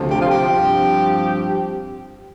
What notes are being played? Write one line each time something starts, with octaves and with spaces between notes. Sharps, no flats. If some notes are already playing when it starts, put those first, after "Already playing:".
Already playing: D2 C3 F3
G4
F4
G4
G2 F3 C4